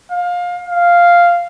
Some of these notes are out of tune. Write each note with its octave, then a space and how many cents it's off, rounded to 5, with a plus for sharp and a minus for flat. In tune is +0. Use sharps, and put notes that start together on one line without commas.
F5 +25
F5 -5